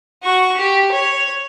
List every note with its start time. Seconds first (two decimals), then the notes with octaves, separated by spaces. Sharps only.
0.23 F#4 C#6
0.57 G4
0.92 C#5